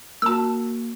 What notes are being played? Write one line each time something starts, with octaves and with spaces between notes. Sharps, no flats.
A#3 F#4 A5 E6